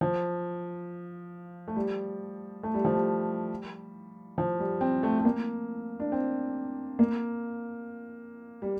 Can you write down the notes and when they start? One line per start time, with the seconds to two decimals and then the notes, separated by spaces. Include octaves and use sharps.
0.01 F3
1.68 A3
1.76 G3
2.63 A3
2.74 G3
2.85 F3
2.95 G3
4.38 F3
4.59 G3
4.81 C4
5.03 A3
5.19 A3
5.25 A#3
6.00 D4
6.12 C4
6.99 A#3
8.62 G3